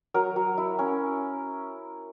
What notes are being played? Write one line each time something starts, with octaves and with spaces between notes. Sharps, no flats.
F#3 A#4
F#3
E4
C#4